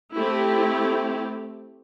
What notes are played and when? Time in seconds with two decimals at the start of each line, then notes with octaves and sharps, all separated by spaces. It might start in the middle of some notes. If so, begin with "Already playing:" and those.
0.15 A3 C4 E4 G4